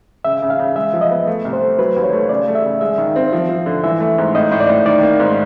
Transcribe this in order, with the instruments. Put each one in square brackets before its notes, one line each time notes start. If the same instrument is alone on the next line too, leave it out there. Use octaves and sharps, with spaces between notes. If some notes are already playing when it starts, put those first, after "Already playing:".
[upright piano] C#3 [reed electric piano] E5
[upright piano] C#3
[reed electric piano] F5
[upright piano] C#3
[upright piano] G#3 [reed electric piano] E5
[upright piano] F3
[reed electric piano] D#5
[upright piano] B3
A3
C2
[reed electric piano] C5
[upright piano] A3
[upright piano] F#3 [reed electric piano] B4
[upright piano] D#2
[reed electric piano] C#5
[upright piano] A3
[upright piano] C#3 [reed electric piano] D5
[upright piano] A3
[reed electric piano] E5
[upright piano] C#3
[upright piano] G#3 [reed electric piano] E5
[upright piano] D#3
C4
F3
F3
D3
[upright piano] E3 [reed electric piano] E5
[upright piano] A3
G#2
[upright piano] A2 [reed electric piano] D#5
[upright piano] A2
[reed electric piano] D5
[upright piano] A2
[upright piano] D#3 [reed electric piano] D5
[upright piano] A#3
G#2